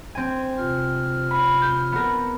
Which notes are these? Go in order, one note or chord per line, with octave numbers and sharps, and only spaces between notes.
C4 G#5
C3 F4 F6
B5
G6
B3 A#4